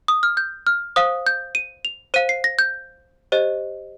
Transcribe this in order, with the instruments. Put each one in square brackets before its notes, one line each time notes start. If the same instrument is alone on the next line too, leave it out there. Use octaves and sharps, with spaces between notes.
[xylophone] D#6
F6
G6
F6
C5 F5 D#6
G6
D#7
F7
C5 F5 D#7
C7
A#6
G6
G4 C5 D#5